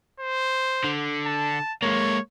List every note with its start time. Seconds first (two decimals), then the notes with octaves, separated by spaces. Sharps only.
0.20 C5
0.84 D3
1.27 A5
1.82 G#3 A#3 C#5